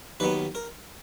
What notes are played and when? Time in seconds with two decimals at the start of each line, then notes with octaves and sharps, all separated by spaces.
0.20 D#2 D#3 F#3 B3 B4
0.55 A#4